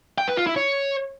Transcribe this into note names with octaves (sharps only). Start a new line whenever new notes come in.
G5
B4
F4
E4
C#5